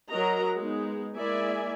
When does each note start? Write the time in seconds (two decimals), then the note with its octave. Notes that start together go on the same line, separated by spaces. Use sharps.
0.11 F#3 F#4 A#4 D#5 A#5
0.57 G#3 B3 D#4
1.15 G#3 A#3 E4 D5 E5 G#5